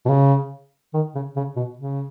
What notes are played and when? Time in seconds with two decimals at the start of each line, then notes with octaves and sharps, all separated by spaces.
0.06 B2
0.09 C#3
0.94 D#3
1.15 C#3
1.36 C#3
1.56 B2
1.77 C#3